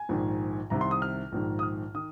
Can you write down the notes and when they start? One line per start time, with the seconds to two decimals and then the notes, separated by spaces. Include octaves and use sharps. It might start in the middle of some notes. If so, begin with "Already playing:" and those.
Already playing: G#5
0.09 A#1 G#2 D#3
0.70 C2 C3 D#3 A#5
0.81 C6
0.91 D#6
1.02 F6
1.32 A#1 G#2 D#3
1.59 D#6
1.63 F6
1.94 D#3 D#6